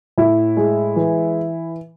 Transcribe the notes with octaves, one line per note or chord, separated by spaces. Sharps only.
A2 E4
G#3
E3